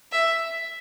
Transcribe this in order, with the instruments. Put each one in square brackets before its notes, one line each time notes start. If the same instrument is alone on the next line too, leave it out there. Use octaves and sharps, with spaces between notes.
[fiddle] E5